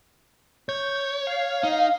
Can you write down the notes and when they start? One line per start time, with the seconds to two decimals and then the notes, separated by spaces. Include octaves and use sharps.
0.69 C#5 G6
1.27 F5
1.63 D#4